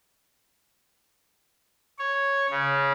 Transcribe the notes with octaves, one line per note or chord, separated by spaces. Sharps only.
C#5
C#3